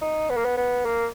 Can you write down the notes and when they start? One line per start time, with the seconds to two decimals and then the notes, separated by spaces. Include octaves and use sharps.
0.01 D#4
0.30 B3
0.37 A#3
0.45 B3
0.57 B3
0.85 A#3